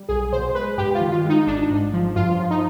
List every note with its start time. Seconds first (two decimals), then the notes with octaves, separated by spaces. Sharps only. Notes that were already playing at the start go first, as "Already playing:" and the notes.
Already playing: G3
0.09 B1 G#4
0.33 B2 C5
0.55 G#3 B4
0.78 G2 G4
0.95 F4
1.01 D#3
1.12 F4
1.25 G#3 D#4
1.47 G#1 D4
1.70 G#2
1.93 F3
2.16 G2 F4
2.40 F3
2.51 D#4